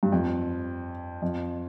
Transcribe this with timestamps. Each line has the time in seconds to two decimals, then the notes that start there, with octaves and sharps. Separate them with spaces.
0.03 G2
0.12 F2
1.22 F2